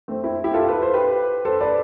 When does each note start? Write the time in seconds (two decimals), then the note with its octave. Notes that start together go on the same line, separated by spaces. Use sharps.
0.08 A3 C4
0.24 C4 E4
0.44 E4 G4
0.53 F4 A4
0.69 B4
0.82 C5
0.94 G4 B4
1.45 A4 C5
1.61 B4 D5